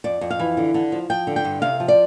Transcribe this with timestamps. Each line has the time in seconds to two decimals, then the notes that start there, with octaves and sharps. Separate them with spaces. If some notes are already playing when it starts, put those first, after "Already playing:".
0.04 F2 D5
0.21 F2
0.30 F5
0.39 E3
0.57 D3
0.74 D3
0.92 F3
1.10 F3 G5
1.27 D3
1.36 G5
1.45 G2
1.62 C3 F5
1.80 F3
1.88 D5